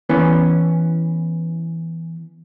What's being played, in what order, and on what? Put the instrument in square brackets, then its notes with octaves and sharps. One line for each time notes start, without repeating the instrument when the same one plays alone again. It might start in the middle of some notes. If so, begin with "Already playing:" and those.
[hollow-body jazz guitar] E3 B3 C#4